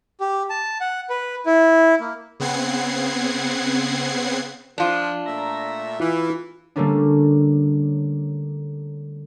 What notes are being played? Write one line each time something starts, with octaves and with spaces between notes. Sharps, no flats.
G4
A5
F#5
B4
E4
A#3
C#3 B3 C4 F#5 G#6 C7
F3 D4 F4
A#2 A3 E5 A#5
E3 E4 F4
D3 G3 A3 A#3 C#4 D4